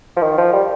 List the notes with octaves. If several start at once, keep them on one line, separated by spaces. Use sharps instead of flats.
F3
D#3
F3
G3